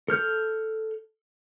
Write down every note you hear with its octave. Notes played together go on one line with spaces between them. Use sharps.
A4 F6 G6